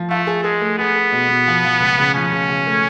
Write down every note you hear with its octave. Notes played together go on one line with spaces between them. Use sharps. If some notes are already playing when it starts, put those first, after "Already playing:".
Already playing: F3
A3 F4
G#4
G#3 G#4
A3
B3 G#4
G#4
B2
B2
F3
F3
C#2
C#3
F3 C#4
C#3
C#3
A3